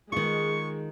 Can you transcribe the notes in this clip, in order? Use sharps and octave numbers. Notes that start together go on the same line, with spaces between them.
D#3 G#3 F4 C#6